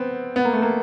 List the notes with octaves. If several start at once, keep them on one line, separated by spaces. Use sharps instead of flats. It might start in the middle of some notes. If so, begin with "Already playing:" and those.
Already playing: B3 C4
B3
A#3
A3
A#3